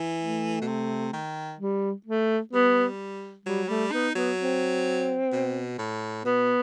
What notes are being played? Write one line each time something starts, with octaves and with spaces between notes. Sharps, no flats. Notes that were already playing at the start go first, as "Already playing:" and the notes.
Already playing: E3
A3
B2
C3
D#3
G3
A3
G3 B3
F#3 G3
G3 A3
B3 D#4
F#3 B3
C4
B2
A2
B2 B3